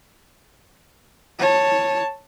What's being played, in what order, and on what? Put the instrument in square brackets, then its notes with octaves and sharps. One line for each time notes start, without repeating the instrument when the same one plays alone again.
[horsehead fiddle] C#5 A5